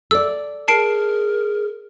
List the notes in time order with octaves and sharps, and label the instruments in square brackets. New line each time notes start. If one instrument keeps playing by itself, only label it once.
[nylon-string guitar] A4 D5 [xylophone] E6
[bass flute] G#4 [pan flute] A#4 [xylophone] A5 C7 D7